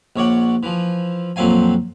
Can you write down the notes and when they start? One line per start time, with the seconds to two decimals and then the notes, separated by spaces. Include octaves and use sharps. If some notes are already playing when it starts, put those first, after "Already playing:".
0.16 A#1 C#5 D5 F#5
0.63 E3 F3
1.36 F2 A#2 F#3 C4 F5 G#5